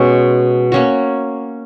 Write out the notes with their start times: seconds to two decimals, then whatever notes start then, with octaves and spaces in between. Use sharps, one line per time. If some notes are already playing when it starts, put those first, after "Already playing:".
Already playing: B2 G#3 C#4
0.72 A#3 C#4 F#4